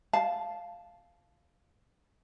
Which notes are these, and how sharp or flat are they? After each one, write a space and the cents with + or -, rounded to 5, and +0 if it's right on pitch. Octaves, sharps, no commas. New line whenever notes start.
F5 +0 A5 -10